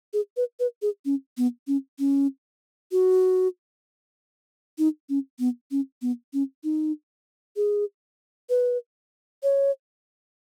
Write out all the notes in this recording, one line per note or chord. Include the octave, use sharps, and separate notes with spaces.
G#4
B4
B4
G#4
C#4
B3
C#4
C#4
F#4
D#4
C#4
B3
C#4
B3
C#4
D#4
G#4
B4
C#5